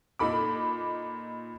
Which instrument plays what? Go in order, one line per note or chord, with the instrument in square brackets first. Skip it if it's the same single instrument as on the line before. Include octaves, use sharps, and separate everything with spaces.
[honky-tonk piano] A#2 D#4 A4 B5 D6